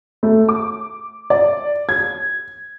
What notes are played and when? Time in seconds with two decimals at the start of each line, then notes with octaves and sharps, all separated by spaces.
0.23 A3
0.49 D6
1.30 D5
1.89 G#6